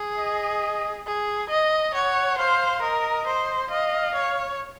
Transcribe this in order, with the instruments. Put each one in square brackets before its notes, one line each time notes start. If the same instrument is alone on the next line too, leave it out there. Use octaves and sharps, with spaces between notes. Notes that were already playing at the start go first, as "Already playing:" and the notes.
Already playing: [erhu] G#4
[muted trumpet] D#5
[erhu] G#4
D#5
[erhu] C#5 [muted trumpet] F#5
[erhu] C5 [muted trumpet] F5
[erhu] A#4 [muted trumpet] D#5
[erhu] C5
[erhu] D#5 [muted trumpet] F5
[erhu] C#5